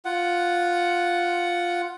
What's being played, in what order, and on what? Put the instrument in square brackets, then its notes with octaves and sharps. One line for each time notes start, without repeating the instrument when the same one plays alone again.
[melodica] F4 F#5